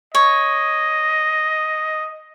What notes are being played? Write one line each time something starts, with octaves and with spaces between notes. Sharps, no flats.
C#5 D#5